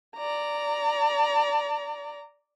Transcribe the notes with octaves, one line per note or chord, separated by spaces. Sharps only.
D5 A#5